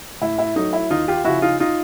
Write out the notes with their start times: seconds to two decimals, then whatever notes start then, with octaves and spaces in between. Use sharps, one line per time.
0.21 A2 E4
0.39 E4
0.56 F#3 A3 D#4
0.73 E4
0.90 D#2 D#4 F4
1.08 F4 G4
1.25 C#3 F3 E4 F#4
1.42 D#4 F4
1.60 D#4 F4